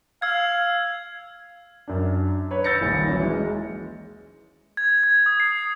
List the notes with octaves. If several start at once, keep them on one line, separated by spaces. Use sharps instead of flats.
F5 E6 G#6
F#2 D4
B4 C#5
E6 G6 A6 A#6 C#7
D#1 A#1
E3 F#3 C#4
G#3
G#6
G#6
D#6
C7